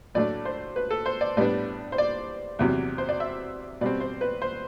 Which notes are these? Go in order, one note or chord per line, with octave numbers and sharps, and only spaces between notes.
A2 F#3 A3 D4 D5
C5
B4
A4
C5
D5
A2 G3 B3 D4 D5
C5
D5
E2 C3 F#3
C5
D5
E5
B2 G3 C4 D5
C5
B4
C5